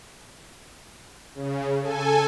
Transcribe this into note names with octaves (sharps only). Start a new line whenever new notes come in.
C#3
A4 G#5